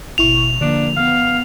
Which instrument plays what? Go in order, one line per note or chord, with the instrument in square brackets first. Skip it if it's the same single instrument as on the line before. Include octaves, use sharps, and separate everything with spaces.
[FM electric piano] G#1 E4 C#6 [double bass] B2 [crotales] F7
[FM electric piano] D3 [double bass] F3 A#3 [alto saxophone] D4
[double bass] B3 [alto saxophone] F5